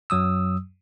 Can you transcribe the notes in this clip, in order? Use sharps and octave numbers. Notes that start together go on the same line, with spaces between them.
F#2 F#3 D#6 E6